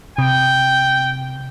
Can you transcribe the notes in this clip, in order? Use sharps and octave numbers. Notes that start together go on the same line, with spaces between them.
C3 G5